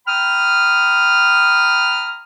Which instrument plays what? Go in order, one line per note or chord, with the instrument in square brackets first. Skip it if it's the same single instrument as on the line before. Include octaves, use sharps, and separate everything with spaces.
[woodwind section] G5 A#5 B5 D#6 F6